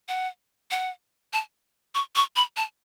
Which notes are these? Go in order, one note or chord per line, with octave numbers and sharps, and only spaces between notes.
F#5
F#5
A5
C#6
C#6
B5
A5